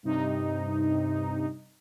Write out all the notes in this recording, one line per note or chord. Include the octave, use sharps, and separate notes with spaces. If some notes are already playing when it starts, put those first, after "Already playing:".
G2 C3 D#4